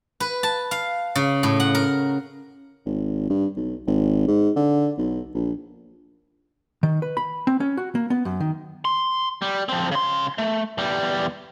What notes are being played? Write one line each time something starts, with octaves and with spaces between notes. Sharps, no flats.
B4
A5
F5
C#3
A2
F#5
A#4
G#1
G2
B1
G#1
G#2
D3
B1
A#1
D#3
B4
B5
C4
C#4
F#4
A#3
B3
F#2
D#3
C6
G3
F3 C4
C#3 C6
A3
E2 G3